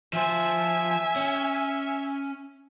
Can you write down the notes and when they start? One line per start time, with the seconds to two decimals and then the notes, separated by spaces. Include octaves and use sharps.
0.13 F3 C5 E5 G#5
1.16 C#4